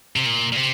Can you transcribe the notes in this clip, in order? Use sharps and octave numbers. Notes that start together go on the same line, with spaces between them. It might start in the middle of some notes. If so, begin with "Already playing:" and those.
C3
A#2
A#2
C3